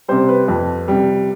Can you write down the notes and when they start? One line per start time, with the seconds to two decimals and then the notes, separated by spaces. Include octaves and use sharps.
0.08 C3 G3 C5
0.28 B4
0.48 F2
0.88 C3 G3